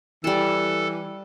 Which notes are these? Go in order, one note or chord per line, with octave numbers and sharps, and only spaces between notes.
E3 G3 A4 A5